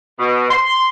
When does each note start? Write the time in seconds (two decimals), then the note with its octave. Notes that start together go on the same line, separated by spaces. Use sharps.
0.19 B2
0.51 C6